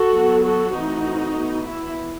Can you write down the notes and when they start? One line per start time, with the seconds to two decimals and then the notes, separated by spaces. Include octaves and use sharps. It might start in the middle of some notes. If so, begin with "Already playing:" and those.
Already playing: F#4 A4
0.13 F#3 B3
0.44 F#4 A4
0.74 E3 A3 C4 D#4 F#4
1.35 E3 B3
1.66 E4